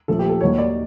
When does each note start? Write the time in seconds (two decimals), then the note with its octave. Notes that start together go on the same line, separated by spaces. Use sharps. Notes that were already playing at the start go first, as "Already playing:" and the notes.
0.08 A#2 F3 A3 A4
0.19 G4
0.29 A4
0.41 D#2 D#3 F#3 C#5
0.58 D5